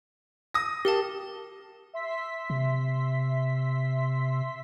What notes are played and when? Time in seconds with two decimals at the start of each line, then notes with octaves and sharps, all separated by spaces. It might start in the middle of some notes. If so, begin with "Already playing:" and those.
0.54 D#6 A#6
0.85 G4 A#4 F5 A5
1.94 E5 C6 B6
2.50 C3